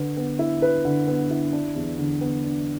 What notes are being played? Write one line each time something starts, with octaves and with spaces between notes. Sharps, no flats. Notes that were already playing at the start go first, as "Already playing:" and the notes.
Already playing: D3 B4
B3
E4
B4
D3
B3
E4
D4
E2
D3
B3
D4